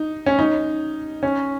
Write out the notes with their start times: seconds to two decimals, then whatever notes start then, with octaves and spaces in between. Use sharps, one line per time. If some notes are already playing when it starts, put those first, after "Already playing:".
Already playing: D#4
0.26 C#4
0.39 D#4
1.23 C#4